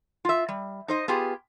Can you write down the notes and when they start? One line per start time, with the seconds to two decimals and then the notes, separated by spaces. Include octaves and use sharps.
0.25 F4 E5
0.48 G3
0.88 D#4 C5 D#5
1.08 B3 F4 G4 G#4